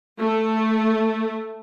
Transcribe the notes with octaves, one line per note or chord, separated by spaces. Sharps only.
A3